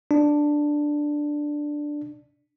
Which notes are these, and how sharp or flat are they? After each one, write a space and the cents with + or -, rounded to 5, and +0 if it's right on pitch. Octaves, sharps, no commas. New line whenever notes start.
D4 +5